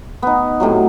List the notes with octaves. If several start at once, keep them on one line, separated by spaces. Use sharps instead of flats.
B3 D#4
A2 C3 F#3